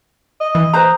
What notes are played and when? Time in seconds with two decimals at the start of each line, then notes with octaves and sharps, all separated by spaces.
0.40 D#5
0.55 E3
0.73 B4 C5 A#5